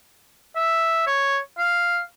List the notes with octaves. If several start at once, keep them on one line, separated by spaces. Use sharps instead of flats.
E5
C#5
F5